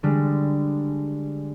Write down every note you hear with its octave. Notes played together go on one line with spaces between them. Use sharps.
D3 G3 G#3